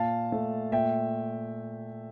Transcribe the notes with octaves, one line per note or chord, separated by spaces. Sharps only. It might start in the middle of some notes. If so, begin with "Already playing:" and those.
Already playing: A#2 F5 A5
A3
A#2 E5 G5